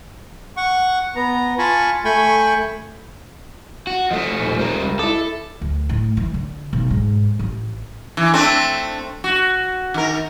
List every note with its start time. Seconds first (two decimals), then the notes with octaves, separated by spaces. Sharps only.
0.57 F#5 C#6
1.16 B3 A#5
1.58 F4 G#5 A5 B5 C#6
2.05 A3 G5 G#5 B5 C#6
3.87 F#4
4.11 F3 A3 D#5
4.39 D#1
4.59 G3 A#4
4.82 C#2
4.99 E4 A4 D6
5.61 D2
5.89 A2
6.17 E3
6.34 D3
6.73 B1
6.90 G#2
7.39 A1
8.17 E3
8.33 A3 C4 D4
9.24 F#4
9.94 D#3 A#4